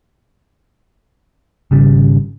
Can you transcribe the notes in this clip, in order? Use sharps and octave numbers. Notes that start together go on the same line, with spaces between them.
G#1 C#3 G3